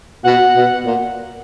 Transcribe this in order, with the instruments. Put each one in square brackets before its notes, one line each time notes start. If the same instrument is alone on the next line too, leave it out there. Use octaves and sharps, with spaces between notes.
[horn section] B2 [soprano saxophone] F#5
[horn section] B2
A#2